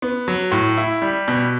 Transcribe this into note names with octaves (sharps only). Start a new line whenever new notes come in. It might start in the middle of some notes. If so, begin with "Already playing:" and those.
B3
F#3
A2
E4
G3
B2